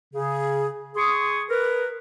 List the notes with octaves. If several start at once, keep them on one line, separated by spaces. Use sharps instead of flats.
C#3 G#4
G#4 C6 C#6 D#6
A#4 B4